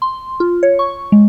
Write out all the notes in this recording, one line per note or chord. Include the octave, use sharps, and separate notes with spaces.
C6
F4
C#5
C#6
G#3